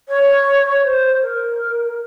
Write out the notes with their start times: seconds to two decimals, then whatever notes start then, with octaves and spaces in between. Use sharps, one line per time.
0.08 C#5
0.83 C5
1.22 A#4